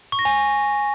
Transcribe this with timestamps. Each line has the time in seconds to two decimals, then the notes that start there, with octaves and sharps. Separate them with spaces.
0.12 C#6
0.19 A#6
0.25 G#5